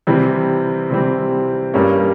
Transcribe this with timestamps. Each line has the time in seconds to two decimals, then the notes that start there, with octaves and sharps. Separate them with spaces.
0.07 C3 E3 G3 C4
0.90 C3 E3 G3 C4
1.74 G2 G3 A#3 C#4